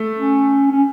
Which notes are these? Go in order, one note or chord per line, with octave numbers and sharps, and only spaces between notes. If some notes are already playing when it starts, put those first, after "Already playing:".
Already playing: A3
C#4
C#4